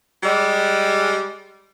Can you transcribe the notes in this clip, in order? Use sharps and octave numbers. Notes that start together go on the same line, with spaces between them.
G3 G#3